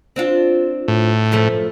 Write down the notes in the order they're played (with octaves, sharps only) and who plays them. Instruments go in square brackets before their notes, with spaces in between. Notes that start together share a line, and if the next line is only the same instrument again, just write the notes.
[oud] C4 D4 F4
[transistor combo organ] A2
[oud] F#2 F3 A3